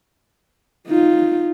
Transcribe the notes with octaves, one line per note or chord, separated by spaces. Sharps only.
D#4 F4